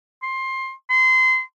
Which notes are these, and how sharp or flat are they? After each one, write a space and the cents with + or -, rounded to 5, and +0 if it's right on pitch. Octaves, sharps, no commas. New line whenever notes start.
C6 +20
C6 -25